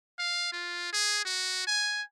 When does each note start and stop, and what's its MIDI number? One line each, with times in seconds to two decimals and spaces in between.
0.18 0.51 77
0.52 0.91 65
0.92 1.20 68
1.25 1.63 66
1.67 2.02 80